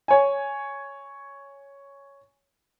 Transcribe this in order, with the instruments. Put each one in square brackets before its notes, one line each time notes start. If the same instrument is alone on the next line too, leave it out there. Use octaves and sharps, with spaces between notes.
[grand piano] C#5 G#5